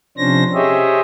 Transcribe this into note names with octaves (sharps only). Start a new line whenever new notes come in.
C3 F3 C#4 D4 C5 A#6
G4 G#4 C5 C#5 D#5 E5